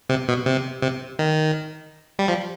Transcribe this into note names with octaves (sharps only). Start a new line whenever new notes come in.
C3
B2
C3
C3
D#3
G3
F3